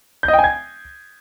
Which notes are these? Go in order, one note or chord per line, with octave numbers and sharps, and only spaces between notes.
G6
D#5
G5
G#5
G#6